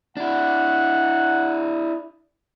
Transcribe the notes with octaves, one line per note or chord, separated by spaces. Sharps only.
D4 E4 F#5